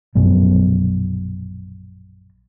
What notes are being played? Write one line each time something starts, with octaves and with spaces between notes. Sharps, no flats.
A#1 F#2 B2